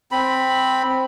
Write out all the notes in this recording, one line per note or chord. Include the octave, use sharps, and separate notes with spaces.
C4 B5